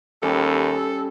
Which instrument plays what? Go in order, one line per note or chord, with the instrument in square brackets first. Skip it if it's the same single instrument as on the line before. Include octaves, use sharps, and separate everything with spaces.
[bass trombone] D#2 [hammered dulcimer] G3 C#4 [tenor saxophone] A4